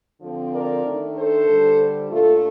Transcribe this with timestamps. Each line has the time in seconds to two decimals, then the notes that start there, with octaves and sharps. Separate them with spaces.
0.20 D3 F3 C4
0.52 A#4 D5
0.84 D#3 A3 D4
1.15 A4 C5
1.47 D3 G3 D4
2.10 A#2 A3 D4 F4 A4